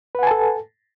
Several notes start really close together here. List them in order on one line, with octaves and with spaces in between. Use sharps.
B4 F#5 G#5 A5 A4